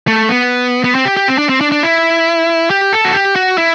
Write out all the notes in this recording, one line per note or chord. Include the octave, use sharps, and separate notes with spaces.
A3
B3
B3
C4
G4
G4
C4
D4
C4
D4
D4
E4
G4
A4
F#4
G4
F#4
E4